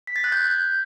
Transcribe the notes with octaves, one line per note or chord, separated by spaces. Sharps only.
B6
A6
F#6
G6
G#6